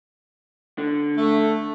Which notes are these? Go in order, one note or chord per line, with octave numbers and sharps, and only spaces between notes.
D3
A3